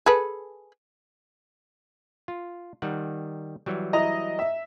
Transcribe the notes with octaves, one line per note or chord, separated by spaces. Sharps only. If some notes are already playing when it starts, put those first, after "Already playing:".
G#4 A4 B4
F4
D#3 G3 F#5
E3 F#3 G3
E4 D#5 A#5
E5